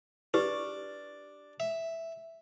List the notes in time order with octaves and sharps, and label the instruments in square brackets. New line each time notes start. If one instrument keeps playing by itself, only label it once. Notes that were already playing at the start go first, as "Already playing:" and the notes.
[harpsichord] D4 [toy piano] G4 B4
[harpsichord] E5